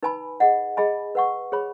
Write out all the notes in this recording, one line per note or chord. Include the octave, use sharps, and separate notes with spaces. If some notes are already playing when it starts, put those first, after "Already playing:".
D#4 B4 G#5 B5
G#4 D#5 F#5
G#4 D#5 G#5 B5
B4 F#5 C#6
G#4 C#5 B5